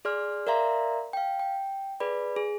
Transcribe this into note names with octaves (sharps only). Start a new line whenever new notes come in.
G#4 D5 C6 F6
A#4 D5 E5 F5 A#5 C6
F5 G5
G5
G#4 B4 D5 B5
G#4